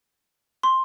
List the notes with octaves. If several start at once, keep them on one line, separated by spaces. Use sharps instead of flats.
C6